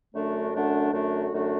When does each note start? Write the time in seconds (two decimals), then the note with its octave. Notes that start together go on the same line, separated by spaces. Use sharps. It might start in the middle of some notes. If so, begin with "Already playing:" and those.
0.13 F#2 D3 A3 D4 F#4
0.53 F#2 D3 A3 D4 F#4
0.92 F#2 D3 A3 D4 F#4
1.32 F#2 D3 A3 D4 F#4